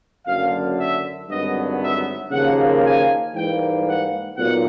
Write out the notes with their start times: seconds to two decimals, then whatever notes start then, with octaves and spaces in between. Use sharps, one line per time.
0.25 F#1 F#2 D3 F5
0.77 E5
1.29 G#1 G2 D3 F#3 B3 D#5
1.80 E5
2.31 D#2 C#3 F3 A#3 F#5
2.83 G#5
3.34 G#2 E3 G3 A#3 G5
3.86 F#5
4.37 B1 A#2 F#5